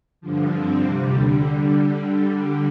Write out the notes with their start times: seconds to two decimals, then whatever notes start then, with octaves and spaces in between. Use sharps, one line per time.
0.21 G2 D3 F3
0.51 G2 D3 F3 C4
0.80 F2 C3 G3
1.10 D#2 D3 G3